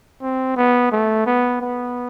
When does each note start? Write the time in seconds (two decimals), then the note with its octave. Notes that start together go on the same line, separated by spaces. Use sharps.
0.22 C4
0.56 B3
0.92 A3
1.27 B3
1.61 B3